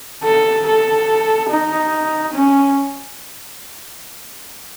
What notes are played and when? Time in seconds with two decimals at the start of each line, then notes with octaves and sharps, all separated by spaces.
0.24 A4
0.67 A4
1.50 D#4
2.34 C#4